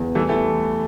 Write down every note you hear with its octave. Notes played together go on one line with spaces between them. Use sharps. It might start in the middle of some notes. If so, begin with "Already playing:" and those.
Already playing: E2
E3 G3 A3
E3 A3